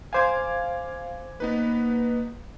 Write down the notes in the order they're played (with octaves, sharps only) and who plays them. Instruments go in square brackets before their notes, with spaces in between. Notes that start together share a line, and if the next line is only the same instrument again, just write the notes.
[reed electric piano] C5 G#5 [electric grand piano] F5 D6 G#6
[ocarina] A#3 [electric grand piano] B3 D#4 B4